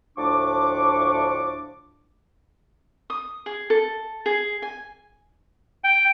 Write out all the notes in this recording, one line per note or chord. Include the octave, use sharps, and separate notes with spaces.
D2 A2 F3 D4 C#6 D6
D#6
G#4
A4
G#4
G#5
G5